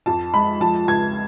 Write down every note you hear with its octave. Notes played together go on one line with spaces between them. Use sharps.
F2 A5
G#3 B5
F3 A5
C#2 G#6